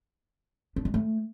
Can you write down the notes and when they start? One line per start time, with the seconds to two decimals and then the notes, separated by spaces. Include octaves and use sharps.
0.76 D4
0.85 G#3
0.94 A3